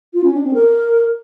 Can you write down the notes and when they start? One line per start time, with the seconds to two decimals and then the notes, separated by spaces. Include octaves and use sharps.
0.13 F4
0.23 C#4
0.33 D4
0.43 C4
0.54 A#4